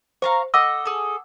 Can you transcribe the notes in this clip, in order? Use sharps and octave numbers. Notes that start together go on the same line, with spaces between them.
C5 F5 A#5 C#6
A4 D#5 F#5 D6 E6
G#4 A4